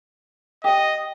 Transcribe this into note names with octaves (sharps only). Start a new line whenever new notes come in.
G4 D#5 F#5